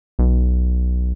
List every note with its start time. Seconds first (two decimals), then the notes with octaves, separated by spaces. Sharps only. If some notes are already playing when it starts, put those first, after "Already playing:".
0.19 B1